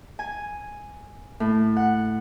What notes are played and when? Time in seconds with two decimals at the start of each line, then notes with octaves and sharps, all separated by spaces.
0.19 G#5
1.40 A2
1.76 F#5